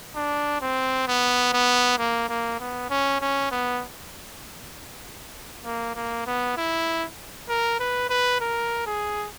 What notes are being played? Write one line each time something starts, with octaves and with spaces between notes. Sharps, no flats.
D4
C4
B3
B3
A#3
A#3
B3
C#4
C#4
B3
A#3
A#3
B3
E4
A#4
B4
B4
A#4
G#4